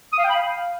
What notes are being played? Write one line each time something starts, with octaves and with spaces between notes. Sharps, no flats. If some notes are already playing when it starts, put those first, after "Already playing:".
D#6
F5
G5
B5
F5